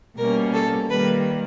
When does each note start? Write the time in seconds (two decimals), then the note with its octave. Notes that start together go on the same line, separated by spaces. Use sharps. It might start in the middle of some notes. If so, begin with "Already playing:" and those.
0.17 B2 G3 A#3 C#4 A#4
0.53 A4
0.89 D#3 G3 A#3 B4